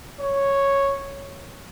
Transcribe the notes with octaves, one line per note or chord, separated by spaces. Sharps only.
C#5